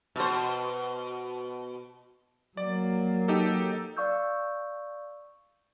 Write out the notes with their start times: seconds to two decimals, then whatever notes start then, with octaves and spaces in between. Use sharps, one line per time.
0.16 B2 C5
2.57 F#3 A#3 D5
3.28 D#4 G4 A4
3.97 D5 F5 C#6 E6 G6